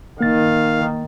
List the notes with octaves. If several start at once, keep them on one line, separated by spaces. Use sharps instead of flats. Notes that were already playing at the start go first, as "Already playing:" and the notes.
D#3 A#3 F5 A6